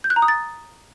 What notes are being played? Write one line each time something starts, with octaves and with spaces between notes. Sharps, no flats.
G6
F#6
A#5
D#6
A6